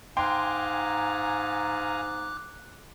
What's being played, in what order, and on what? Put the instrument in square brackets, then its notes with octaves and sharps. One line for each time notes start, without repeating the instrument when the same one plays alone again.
[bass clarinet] G#2 [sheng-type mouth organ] F5 G#5 A#5 [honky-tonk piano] G5 C6 [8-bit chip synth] D6 F#6